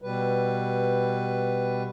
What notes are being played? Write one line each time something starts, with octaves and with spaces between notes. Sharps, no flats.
B2 G3 B4